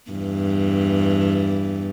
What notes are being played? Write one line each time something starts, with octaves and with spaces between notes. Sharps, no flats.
E2 G2 E3